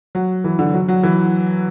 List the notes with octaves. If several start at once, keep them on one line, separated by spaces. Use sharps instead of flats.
F#3
E3
D3
F#3
F#3
E3